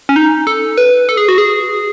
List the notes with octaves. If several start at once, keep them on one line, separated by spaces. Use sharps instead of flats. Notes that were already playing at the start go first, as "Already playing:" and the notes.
C#4
D#4
A4
B4
A4
G#4
F#4
G#4